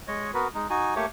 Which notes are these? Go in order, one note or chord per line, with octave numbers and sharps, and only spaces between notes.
G#3 C#5 D#5
B3 F#4 A#4 B4
G#3 D#4
D#4 F#4 G#5
A3 A#3 G4 C#5